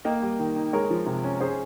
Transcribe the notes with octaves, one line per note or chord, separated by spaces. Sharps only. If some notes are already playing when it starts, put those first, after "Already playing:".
A#3 D#5 G5
G3
D#3
D#4
G#3 A#4 C#5
F3
C3
C#4
C#4 G#4 C5